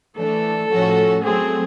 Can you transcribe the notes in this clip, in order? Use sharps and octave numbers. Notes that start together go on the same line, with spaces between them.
E3 A3 D4 A4
A2 F3 A3 C#4 F#4
F#3 A3 C4 G#4